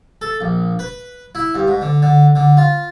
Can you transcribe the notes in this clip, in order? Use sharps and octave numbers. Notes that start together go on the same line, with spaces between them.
A4
A#1
B4
E4
G2
G#2
D3
D3
D3
F4